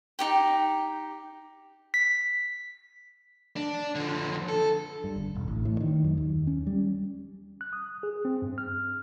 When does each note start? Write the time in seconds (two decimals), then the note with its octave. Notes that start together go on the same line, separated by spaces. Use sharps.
0.19 D#4 G4 G5
1.94 B6
3.56 D4
3.95 D3 F3
4.49 A4
5.04 G2
5.16 G1
5.35 E1
5.48 A1
5.65 A2
5.80 D#3
6.04 F#2
6.17 D#2
6.47 C#4
6.67 G3
7.61 F#6
7.73 D#6
8.03 G#4
8.25 C4
8.42 G2
8.58 F6